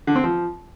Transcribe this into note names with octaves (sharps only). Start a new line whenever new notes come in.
D3
C4
F3